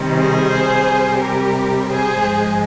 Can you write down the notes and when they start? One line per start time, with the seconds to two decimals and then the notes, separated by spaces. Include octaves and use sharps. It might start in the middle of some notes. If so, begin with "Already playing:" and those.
Already playing: C3 D#3 G3
0.16 G#4 C5
0.84 C3 G3
1.18 G4 A#4
1.86 G#4 C5
2.21 G#2 F3 G#3